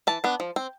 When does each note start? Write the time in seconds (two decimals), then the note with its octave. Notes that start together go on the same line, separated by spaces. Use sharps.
0.07 E3 A5
0.24 B3 D4
0.40 F3
0.56 C4